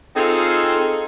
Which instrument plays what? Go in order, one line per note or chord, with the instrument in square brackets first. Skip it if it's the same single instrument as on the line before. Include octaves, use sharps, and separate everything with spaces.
[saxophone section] C4 D#4 F4 G#4 A4